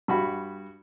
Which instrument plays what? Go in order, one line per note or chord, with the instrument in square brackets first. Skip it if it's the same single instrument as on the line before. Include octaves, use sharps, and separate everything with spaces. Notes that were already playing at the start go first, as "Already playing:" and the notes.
[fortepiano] G2 F#4 B5